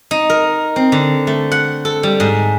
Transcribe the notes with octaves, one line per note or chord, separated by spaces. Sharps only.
D#4
A#4
C4
D3
A3
F#5
A4
G3
G#2